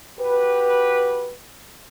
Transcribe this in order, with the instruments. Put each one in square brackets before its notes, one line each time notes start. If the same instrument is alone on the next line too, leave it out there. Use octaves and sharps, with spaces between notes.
[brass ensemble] F#4 G4 B4